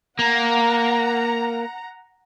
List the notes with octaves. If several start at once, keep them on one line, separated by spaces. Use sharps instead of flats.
A#3 F#5 A#5